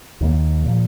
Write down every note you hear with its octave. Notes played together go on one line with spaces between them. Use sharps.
D#2 D#3 A#3
A#2 F3